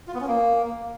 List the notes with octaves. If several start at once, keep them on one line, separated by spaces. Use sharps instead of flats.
F4
B3
C#4
A#3